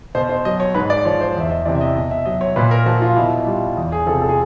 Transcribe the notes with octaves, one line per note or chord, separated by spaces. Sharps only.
B2 C5
C5
F#3 D#5
C#5
G#2 B4
D5
F3 C#5
C5
E2 E5
D#5
C3 E3 D5
E5
D#5
B2 D#5
E5
F#3 D#5
C#5
A#2 B4
A#4
F3 F#4
F4
B2 E4
G3 F4
E2
G#4
C3 F3 A4
A4
G#4